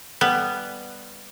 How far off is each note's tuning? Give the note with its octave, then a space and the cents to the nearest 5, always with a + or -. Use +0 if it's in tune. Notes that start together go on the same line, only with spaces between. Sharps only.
G3 +5 B3 +0